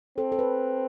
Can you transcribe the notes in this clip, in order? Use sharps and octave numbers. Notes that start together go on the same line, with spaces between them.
C4 A4
A4
B4